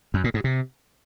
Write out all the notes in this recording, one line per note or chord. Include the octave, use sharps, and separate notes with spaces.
F#2
A#2
G#2
C3